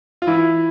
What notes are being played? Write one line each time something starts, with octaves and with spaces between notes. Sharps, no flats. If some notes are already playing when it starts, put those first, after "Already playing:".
F4
E3 E4